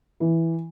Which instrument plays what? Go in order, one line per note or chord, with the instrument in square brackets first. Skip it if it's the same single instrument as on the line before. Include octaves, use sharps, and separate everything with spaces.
[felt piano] E3